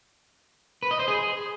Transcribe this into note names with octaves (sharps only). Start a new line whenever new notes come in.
B4
D#5
C5
G#4